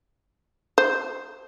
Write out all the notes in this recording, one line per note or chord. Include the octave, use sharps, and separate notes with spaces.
C5